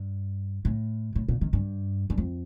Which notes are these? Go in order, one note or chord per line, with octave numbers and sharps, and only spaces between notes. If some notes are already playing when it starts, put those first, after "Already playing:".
Already playing: G2
A2
A2
A#2
D#3
G2
G2
F2